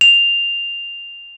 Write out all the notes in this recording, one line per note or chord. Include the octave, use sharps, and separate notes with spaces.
F7